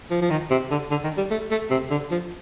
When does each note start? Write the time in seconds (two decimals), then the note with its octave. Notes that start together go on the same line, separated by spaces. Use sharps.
0.11 F3
0.22 F3
0.30 D#3
0.50 C3
0.71 D3
0.91 D3
1.04 D#3
1.17 G3
1.31 A3
1.51 A3
1.70 C3
1.91 D3
2.11 F3